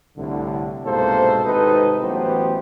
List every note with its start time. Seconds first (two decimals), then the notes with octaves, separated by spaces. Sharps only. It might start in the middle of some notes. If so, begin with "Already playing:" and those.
0.17 C2 A2 D3
0.85 C2 G#2 B2 A#3 A4 C5
1.45 G#1 C3 D#4 A4 B4
2.01 A1 E3 F#3 B3 G4 C5